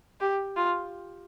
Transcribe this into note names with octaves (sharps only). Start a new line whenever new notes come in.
G4
F4